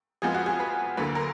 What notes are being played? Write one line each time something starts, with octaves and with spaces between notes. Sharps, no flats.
F2 F3 G#3 B3 F4 G#4
F#4
G#4
B4
D2 D3 F#3 A#3 B4
A#4